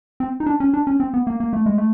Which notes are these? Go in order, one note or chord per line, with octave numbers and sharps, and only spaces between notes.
C4
D#4
D4
C#4
D4
C#4
C4
B3
A#3
A#3
A3
G#3
A3